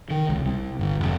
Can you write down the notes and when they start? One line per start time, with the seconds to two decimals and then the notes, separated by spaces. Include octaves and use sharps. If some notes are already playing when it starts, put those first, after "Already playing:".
0.11 D#3
0.29 C#2
0.45 C2
0.79 G1
1.00 F1